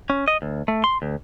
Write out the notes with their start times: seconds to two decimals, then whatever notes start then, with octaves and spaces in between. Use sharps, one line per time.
0.10 C#4
0.28 D#5
0.42 D2
0.68 A3
0.84 C6
1.02 D2